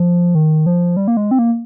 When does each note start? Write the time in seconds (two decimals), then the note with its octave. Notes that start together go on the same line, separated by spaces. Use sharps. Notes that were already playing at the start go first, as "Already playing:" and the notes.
Already playing: F3
0.35 D#3
0.66 F3
0.97 G3
1.08 A#3
1.17 G#3
1.31 C4
1.39 A#3